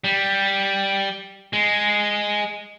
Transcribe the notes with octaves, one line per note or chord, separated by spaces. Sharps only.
G3
G#3